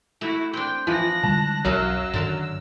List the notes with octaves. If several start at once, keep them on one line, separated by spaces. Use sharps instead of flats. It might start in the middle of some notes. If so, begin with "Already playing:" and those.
A3 E4 F#4
C4 D4 G5
E3 F3 F#6 A#6
D3 G3 G#3 A5
B1 F#2 F#3 F5 F#5 E6
G2 D3 D#3 A#4 A5